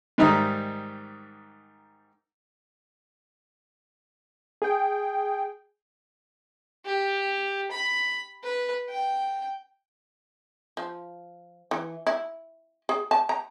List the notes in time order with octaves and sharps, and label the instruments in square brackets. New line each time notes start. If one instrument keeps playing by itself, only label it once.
[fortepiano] G#2 D#3 G3 E5 A#5 D#6
[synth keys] G#4 G5
[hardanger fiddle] G4
B5
B4
G5
[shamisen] F3
E3
E4
G#4
A5
A#5